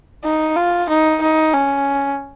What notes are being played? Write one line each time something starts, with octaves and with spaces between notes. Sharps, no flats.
D#4
F4
D#4
D#4
C#4